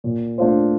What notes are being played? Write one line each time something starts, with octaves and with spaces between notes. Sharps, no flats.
A#2
A3 D4 F4 C5